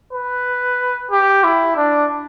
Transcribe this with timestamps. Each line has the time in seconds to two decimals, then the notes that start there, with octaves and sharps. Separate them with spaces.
0.13 B4
1.11 G4
1.44 E4
1.77 D4